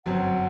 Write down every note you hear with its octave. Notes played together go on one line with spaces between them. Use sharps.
G1 F#2 F#3 C4 F#5